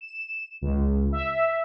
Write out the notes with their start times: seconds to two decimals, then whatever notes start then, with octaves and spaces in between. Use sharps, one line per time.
0.01 E7
0.62 C#2
1.12 E5